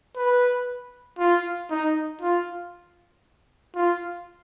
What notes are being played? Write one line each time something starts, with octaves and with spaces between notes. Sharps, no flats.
B4
F4
D#4
F4
F4